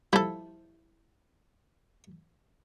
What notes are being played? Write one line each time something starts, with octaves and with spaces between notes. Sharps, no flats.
F3 G3 E4 A4